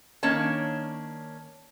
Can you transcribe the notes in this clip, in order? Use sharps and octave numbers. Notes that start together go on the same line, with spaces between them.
D#3 A#3 C#4 D4 C#5 A5